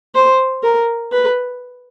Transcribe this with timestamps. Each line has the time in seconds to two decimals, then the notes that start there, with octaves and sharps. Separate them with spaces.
0.15 C5
0.63 A#4
1.12 B4